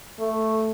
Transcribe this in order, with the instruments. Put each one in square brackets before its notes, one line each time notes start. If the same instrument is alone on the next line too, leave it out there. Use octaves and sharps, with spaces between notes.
[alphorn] A3